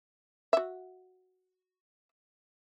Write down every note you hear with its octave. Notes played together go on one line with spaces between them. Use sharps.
F#4 E5